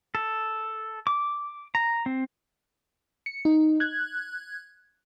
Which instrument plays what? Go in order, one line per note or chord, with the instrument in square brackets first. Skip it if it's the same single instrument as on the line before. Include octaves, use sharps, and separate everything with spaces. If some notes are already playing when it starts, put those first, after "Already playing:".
[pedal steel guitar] A4
D6
A#5
C4
[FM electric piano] C#7
D#4
F#6 G#6